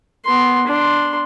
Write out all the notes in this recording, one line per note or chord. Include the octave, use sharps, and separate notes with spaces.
B3 C6
D4 C6